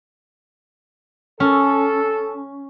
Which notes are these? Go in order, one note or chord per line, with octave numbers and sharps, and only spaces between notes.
C#4 A4